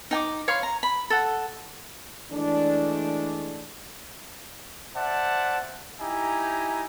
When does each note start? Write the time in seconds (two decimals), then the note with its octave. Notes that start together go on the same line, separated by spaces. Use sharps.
0.11 D#4 G5 D6
0.48 C#5 F5 B5 C6
0.63 A#5
0.83 B5
1.10 A4 F#5
2.31 E3 G#3 A3 D4
4.95 C5 D5 E5 F#5 A5
6.00 D#4 E4 G4 G#5 A#5